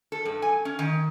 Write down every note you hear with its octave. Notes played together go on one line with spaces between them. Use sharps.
A4
G2
G#5
C#4
D#3